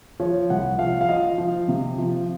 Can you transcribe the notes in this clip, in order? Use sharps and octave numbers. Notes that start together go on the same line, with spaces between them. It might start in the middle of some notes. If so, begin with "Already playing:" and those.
F3 C#5
C2 F#5
F3 F5
F5
F3 D#5
F3
C3
F3